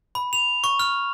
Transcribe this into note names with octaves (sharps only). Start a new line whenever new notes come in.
B5
F7
C#6
F6